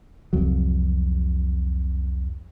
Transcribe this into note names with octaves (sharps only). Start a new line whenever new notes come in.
C2 F2 F#3